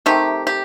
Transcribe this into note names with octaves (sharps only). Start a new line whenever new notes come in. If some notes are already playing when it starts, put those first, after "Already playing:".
C3 D#3 A3 D#4 G4
G4